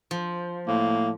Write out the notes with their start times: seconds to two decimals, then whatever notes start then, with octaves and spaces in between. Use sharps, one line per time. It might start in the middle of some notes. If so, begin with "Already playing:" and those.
0.11 F3
0.68 A2 A#3